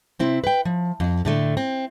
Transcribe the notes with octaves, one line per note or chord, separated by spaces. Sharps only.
C3 C4 E4
B4 G5
F3
F2
A2 D3 A3
C4